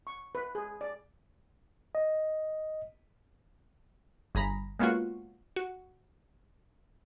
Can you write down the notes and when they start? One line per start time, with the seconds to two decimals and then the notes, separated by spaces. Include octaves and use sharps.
0.07 C#6
0.35 B4
0.55 G#4
0.81 D5
1.95 D#5
4.35 G1 G#4 A#5 B5
4.79 G#3 A#3 B3 C#4 F4 F#4
5.56 F#4